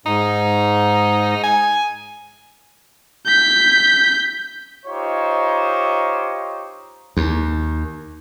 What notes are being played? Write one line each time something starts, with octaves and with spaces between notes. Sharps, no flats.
G#2 D#4
G#5
G6 B6
D#4 F4 G4 C5 C#5
D#2